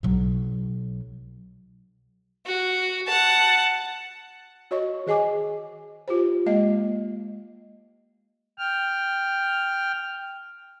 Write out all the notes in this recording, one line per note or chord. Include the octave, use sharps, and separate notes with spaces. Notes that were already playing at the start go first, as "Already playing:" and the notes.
B1 F#3
F#4
F#5 A5
F#4 C#5 D#5 C#6
D#3 G#4 D#5 G#5 D6
F4 G4 C5
G#3 A#3 D#5
G5 F6